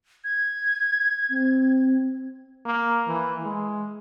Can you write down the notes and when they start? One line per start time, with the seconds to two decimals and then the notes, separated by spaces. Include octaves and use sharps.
0.24 G#6
1.30 C4
2.65 A#3
3.08 E3
3.44 G#3